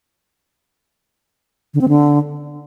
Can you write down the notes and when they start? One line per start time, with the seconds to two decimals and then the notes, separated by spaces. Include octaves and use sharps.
1.74 D3
1.81 C4
1.89 D3